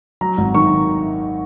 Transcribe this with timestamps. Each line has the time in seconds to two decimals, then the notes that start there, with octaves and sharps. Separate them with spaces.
0.21 F#3 A#5
0.38 G#1
0.55 D#3 C#6